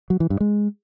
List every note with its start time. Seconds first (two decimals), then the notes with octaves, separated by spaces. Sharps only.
0.10 F#3
0.20 E3
0.30 G2
0.40 G#3